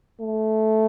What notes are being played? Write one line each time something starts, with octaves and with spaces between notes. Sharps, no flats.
A3